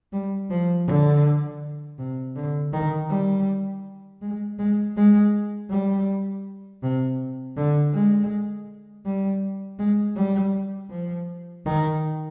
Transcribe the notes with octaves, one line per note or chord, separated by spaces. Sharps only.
G3
F3
D3
C3
D3
D#3
G3
G#3
G#3
G#3
G3
C3
D3
G#3
G3
G#3
G3
F3
D#3